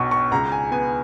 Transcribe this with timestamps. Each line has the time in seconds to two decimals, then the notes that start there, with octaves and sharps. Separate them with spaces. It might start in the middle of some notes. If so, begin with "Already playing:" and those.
Already playing: B1 B2 C#6
0.11 C#6
0.32 C#2 A#5
0.52 G#5
0.72 B3 G#5